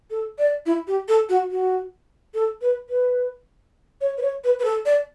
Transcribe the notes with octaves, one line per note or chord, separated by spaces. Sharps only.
A4
D5
E4
G4
A4
F#4
F#4
A4
B4
B4
C#5
B4
C#5
B4
B4
A4
D5